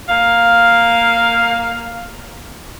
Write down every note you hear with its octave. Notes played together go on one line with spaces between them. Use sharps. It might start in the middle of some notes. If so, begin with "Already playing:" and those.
A#3 F5